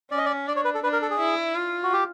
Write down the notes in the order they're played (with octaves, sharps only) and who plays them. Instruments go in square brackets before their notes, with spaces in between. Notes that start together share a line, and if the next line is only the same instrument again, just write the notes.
[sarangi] C#4 [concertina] D5
[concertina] D#5
D5
[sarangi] D4 [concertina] D5
[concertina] C#5
B4
A4
[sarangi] D4 [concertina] B4
[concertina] A#4
A4
G#4
[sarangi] E4
F4
[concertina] F#4
G4